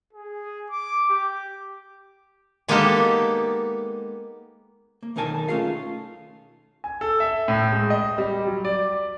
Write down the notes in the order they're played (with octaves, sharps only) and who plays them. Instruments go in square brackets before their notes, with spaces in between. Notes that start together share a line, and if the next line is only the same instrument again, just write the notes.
[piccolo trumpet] G#4
D6
G4
[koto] G#3 A#3 B3 D#4 G4 A4
[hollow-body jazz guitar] A#3
B1 D#3 D#4 A#4 G#5 A5
A3 C#4 F4 G#4 F5
[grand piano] G#5
A4
E5
A2
G#3
D#5
G3
F#3
D5